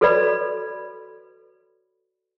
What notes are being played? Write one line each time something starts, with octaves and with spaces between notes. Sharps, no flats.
F#4 A4 B4 C#5 D5 B5